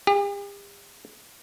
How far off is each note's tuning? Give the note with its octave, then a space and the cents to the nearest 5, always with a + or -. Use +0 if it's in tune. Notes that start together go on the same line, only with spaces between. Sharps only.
G4 +45